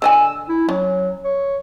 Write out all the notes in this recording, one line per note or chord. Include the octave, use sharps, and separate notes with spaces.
D3 D#5 G#5 E6
E4
F#3 C#4
C#5